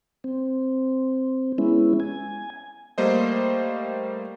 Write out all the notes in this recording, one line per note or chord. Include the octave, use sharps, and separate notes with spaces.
C4
G#3 B3 C#4 E4
G#5
G3 A3 A#3 C5 D#5